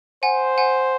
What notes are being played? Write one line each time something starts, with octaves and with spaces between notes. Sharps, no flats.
C5 F#5 G#5
F#5 G#5